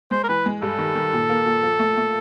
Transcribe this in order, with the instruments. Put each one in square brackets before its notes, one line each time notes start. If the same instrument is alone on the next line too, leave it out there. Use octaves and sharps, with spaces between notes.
[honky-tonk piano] G#3 [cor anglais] C5
[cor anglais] A#4
[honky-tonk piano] E3 [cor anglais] B4
[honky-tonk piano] G#3
[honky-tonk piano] G2 [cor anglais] A4
[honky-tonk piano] D#3
D#3
A#2
A#3
A#2
F3
A3
A3